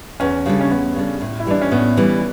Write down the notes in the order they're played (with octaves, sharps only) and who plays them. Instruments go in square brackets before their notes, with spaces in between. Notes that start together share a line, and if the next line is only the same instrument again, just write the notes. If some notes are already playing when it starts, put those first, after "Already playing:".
[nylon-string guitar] E2 [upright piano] C#4
[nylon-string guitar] C#3 G3 D4 A4
[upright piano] C#4
[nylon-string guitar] E2 [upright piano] B3
[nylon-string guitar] C#3 G3 D4 A4
A2
[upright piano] E4
[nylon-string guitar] E3 G3 [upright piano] D4
[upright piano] C#4
[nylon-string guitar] A2 [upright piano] B3
[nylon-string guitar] E3 G3